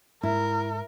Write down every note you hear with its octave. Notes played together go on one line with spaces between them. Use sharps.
G#2 E4 A#4